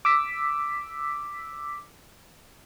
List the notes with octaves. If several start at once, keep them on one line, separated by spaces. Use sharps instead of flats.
D6 E6 B6